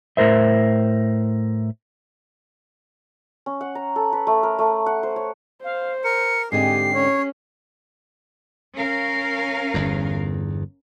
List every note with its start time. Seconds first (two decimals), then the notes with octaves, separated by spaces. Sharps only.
0.17 A2 A#4 C5 E5
3.46 C#4
3.61 F#5
3.75 A#5
3.96 A4
4.13 B4
4.27 A3
4.43 A#4
4.59 A3
4.86 F#5
5.03 C5
5.16 C#5
5.64 C5 F5
6.04 A#4 C#7
6.52 G#2 D3 C4 G4 G#4 C7
6.95 C#4 C#5
8.76 C#4 A#4 F5
9.74 G1 E2